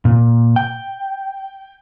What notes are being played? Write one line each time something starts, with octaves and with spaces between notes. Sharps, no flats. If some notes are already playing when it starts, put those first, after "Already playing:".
A#2
G5